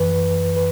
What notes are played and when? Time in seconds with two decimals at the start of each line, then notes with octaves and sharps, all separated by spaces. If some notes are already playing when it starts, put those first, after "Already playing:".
Already playing: F#2 E3 B4
0.57 B4